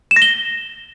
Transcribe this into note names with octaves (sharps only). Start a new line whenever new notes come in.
E7
A#6
G7